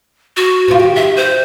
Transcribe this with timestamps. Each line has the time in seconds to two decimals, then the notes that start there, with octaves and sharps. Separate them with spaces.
0.37 F#4
0.68 B2 F3 F4
0.80 D#3 G4
0.96 E5
1.17 C5